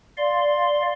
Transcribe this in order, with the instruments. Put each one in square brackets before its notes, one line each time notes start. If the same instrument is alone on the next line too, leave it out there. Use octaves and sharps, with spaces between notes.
[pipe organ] D5 F5 C6